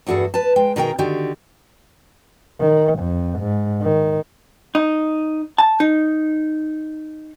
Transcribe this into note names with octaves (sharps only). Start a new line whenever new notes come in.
E2 G2 F#4 G#4 A4
B4 A5
G#3 G5
B2 D#3 G#4 A#4 E5 G5
D3 D#3 F#4 G4
D#3
F2
G#2
D#3
D#4
A5
D#4